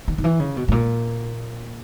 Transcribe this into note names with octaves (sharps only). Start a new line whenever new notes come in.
D#3
D#3
E3
C#3
B2
G#2
A#2